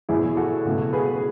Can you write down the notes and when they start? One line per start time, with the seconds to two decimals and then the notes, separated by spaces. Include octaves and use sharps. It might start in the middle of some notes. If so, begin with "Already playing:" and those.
0.09 E2 B2 F#3 E4 G#4
0.37 F#4 A4
0.65 C#2 B2 A3
0.93 G#4 B4